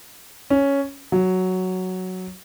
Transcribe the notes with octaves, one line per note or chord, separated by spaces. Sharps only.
C#4
F#3